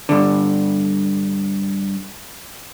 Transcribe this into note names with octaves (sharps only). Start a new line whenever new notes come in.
G2 D3